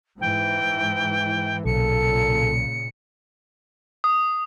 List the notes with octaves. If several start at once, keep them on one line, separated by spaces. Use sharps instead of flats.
G#2 E3 G5
B1 A#2 C#3 A4 C#7
D#6